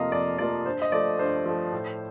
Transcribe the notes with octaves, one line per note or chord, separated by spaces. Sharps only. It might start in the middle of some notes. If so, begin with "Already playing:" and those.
Already playing: F2 C3 F3 A#3 D#5 F5
F2 D5
C3 F3 A#3 D5
G2 C5
D#5
F3 A3 D5
G2 C5
F3 A3
A2